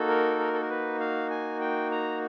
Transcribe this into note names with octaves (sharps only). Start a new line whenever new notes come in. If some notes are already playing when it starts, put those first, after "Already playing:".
Already playing: A#3 D#4 F#4 A4
A#4
A#4
A4
A#4
B4
F5
G#5
G5
A#5